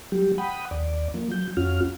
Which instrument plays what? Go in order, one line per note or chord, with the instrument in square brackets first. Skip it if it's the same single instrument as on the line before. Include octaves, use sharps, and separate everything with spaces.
[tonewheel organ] F#3 G3 G4
F#5 G5 B5 D#6
D#2 D5
F3 A#3
F#3 G6
F2 C#4 F4 F#4 F6